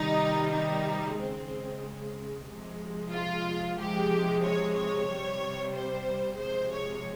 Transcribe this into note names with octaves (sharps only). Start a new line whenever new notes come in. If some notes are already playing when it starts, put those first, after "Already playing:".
Already playing: C3 D#3 G3 D#4
D#4
C#3 G#3 C4
C3 F3 G#3
F4
C3 F3 G#3 G4
C#5
C#5
C3 G3
C5
C3 F3 G#3 C5
C#5